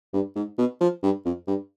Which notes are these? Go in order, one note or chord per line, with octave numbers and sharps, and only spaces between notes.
G2
G#2
B2
F3
G2
F2
G2